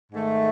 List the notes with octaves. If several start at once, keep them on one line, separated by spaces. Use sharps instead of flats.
G#2 D#3 A3